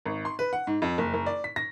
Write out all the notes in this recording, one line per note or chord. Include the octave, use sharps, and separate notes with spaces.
G#1
C6
B4
F#5
G#2
F2
F#1
F#1
D5
B6
A#6